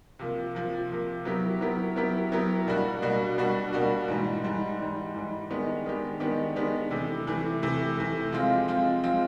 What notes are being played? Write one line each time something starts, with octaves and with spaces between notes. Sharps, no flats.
C3 F3 A#3
C3 F3 A#3
C3 F3 A#3
F#3 B3 E4 G4 A#4
F#3 B3 E4 G4 A#4
F#3 B3 E4 G4 A#4
F#3 B3 E4 G4 A#4
B2 G3 A#3 D4 F#4
B2 G3 A#3 D4 F#4
B2 G3 A#3 D4 F#4
B2 G3 A#3 D4 F#4
G#2 E3 G3
G#2 E3 G3
G#2 E3 G3
G#2 E3 G3
D#3 G#3 B3 D4 G4
D#3 G#3 B3 D4 G4
D#3 G#3 B3 D4 G4
D#3 G#3 B3 D4 G4
C3 E3 A3
C3 E3 A3
C3 E3 A3
C3 E3 A3
F3 G#3 C4 F4
F3 G#3 C4 F4
F3 G#3 C4 F4